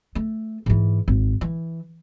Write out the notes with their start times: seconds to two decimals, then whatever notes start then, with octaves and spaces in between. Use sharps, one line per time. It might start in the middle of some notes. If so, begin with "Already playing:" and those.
0.15 A3
0.66 G#2 E3
1.08 G#1
1.41 E3